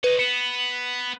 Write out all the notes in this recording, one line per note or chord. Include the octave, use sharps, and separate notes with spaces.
B4 C#5 D#5
B3 C#7 E7